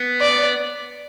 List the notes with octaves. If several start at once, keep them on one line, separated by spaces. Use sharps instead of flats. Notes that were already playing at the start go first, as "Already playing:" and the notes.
Already playing: B3
D5